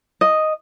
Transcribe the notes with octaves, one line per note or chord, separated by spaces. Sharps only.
D#5